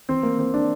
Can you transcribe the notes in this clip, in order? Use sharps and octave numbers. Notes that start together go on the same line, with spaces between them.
E3 C4
A#3
E3 C4
D4